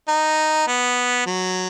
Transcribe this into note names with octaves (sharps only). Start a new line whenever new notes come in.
D#4
B3
F#3